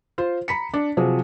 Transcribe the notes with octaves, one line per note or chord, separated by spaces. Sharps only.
F4 C5
A#5 B5 B6 C#7
D4
C3 F3 F#3 G#4